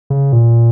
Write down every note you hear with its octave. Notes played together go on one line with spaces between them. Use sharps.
C#3
A#2